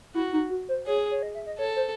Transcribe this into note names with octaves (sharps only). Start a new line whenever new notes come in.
E4 F#4
D#4
F#4
C5
G#4 C#5
C#5
D#5
E5
D#5
A4 C#5
C5